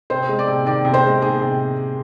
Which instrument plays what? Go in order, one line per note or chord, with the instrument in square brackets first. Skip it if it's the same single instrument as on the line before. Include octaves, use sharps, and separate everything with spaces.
[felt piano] C3 C5
G#3
D5
C3
D#3 D5
C3
C5
G#3
D#3 G#4
C3